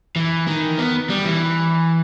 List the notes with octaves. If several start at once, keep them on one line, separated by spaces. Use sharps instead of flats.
E3
D#3
B3
G3
E3